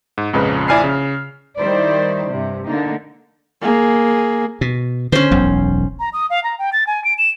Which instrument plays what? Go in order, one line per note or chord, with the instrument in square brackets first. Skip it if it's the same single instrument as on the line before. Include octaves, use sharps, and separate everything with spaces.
[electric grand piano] G#2
A#1 F2 C#3 G#3 B4
A#1 E4 D5 G#5 F6 C7
C#3
[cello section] D#3 G3 E4 C5 D5
G2 C3
D3 A#3 D#4
[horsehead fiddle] A#3 G#4
[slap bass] B2
[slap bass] D3 [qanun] C#4 C5
[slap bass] E1 B1 F#2
[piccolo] A#5
D#6
F5
A#5
G5
A6
G#5
D7
E7